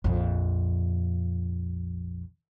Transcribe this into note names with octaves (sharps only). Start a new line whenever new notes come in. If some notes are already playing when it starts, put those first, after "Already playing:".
A#1 F2